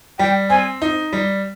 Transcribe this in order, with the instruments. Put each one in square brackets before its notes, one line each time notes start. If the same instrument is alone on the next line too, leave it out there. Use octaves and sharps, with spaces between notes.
[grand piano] G3 [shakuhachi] G5
[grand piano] C4 [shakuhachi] G#5
[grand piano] D#4
G3